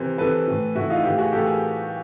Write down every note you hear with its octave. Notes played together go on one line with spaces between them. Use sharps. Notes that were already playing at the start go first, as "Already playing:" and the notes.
Already playing: C3 E3 A#4 C5
C3 E3 A4 B4
A2 E3
A2 E3 E4 F#4
D#4 F4
A2 E3 F4 G4
F#4 G#4
A2 E3 G4 A4
G#4 A#4